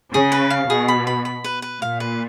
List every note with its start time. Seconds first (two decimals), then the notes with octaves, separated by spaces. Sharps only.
0.13 C#3 G#4
0.32 B4
0.50 F5
0.70 B2 G#4
0.88 B5
1.07 B5
1.25 B5
1.44 B4
1.62 B4
1.81 A#2 F5
2.00 B4